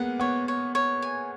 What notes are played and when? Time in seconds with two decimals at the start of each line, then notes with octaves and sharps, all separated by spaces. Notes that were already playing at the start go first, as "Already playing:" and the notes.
Already playing: G#3 A#3 B3 F#5
0.19 B3 C#5
0.48 C#5
0.75 C#5
1.02 G#5